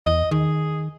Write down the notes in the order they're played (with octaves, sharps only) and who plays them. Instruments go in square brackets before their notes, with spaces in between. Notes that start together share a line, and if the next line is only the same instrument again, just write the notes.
[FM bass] E2 [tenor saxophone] D#5
[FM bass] D#3 [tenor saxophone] G#4